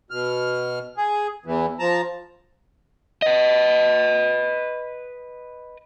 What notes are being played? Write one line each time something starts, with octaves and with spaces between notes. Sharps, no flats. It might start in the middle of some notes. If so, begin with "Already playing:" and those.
B2 F6
G#4
E2 E3
F3 A5 A#5
B4 D#5